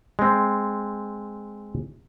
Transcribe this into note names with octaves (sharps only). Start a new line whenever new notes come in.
G#3 C4